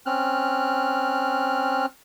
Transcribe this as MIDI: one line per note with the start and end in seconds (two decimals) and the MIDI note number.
0.06 1.86 60
0.06 1.86 61
0.06 1.86 89
0.06 1.86 90